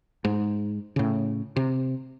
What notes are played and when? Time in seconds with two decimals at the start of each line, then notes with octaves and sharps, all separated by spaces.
0.25 G#2
0.96 A2 C#3
1.56 C3